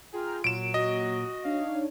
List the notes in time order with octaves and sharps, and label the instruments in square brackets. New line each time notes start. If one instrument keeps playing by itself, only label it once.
[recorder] F4 [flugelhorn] G#4 [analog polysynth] G5 A#5 F6
[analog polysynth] A#2 [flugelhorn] F#3 [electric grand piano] D7 E7
[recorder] F#4 [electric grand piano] D#5
[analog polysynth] D4 D#4 C#5 [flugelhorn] F5